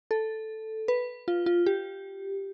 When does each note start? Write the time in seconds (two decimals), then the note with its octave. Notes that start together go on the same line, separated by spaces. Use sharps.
0.11 A4
0.88 B4
1.28 F4
1.46 F4
1.66 G4